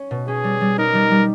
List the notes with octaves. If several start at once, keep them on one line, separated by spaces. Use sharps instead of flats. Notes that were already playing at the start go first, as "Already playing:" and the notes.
Already playing: C#4
B2
C#4 G#4
G3
G3
D#4 A#4
G3
G3